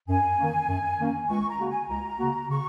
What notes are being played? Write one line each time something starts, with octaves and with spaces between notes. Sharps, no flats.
F#2 G#5
D#3 A#3 C#4
F#2
D#3 A#3 C#4
C#2 C#6
A#5
C#3 A#3 F#4
G#5
C#2 A#5
C#3 A#3 F#4
C#3 C#6